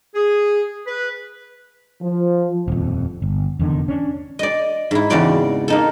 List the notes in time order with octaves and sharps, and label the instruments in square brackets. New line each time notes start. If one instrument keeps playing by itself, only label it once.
[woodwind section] G#4
B4
[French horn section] F3
[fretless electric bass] D#1 F2
G1
F1 E2 D3 D#3
C#4 D4
[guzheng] D5 D#5
G#2 E4
E2 C#3 C4 F#4 D5 C6
A#3 D#4 A4